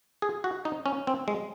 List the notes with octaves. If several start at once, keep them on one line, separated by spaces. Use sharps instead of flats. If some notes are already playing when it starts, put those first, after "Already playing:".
G#4
F#4
D#4
C#4
C4
G#3